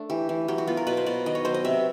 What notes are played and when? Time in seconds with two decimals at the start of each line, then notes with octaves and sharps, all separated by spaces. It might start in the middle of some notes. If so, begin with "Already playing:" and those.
Already playing: A3 D4
0.10 E3 G4
0.29 E3
0.48 F#3 G4
0.58 F#4
0.67 B3 F4
0.77 A#4
0.87 B2 B4
0.97 C5
1.06 B2 D5
1.26 D#3 D#5
1.35 C#5
1.45 F#3 C5
1.54 D#5
1.64 C3 E5